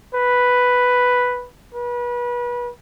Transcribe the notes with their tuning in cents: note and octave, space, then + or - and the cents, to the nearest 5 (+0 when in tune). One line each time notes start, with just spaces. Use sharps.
B4 +0
B4 -30